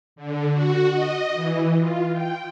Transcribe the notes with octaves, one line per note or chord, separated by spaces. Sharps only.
D3
F#4
D#5
E3
F4
G5